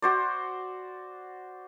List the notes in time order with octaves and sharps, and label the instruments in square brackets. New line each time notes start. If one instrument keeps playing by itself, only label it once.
[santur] F#4 C5 D5